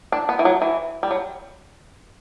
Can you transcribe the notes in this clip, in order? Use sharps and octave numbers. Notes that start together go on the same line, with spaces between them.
D4
B3
E3
F#3
E3
G3
F#3